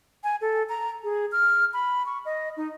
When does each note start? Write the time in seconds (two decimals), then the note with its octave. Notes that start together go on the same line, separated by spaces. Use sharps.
0.24 G#5
0.41 A4
0.69 A#5
1.04 G#4
1.32 F6
1.73 B5
2.06 C#6
2.25 D#5
2.57 D#4